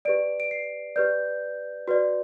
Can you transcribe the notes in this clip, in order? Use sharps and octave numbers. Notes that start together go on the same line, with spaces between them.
G4 B4 D5 D7
D7
C7
G4 B4 D5 G6
F#4 B4 D5